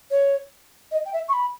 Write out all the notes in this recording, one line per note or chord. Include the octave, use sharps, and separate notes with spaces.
C#5
D#5
G5
E5
C#6
B5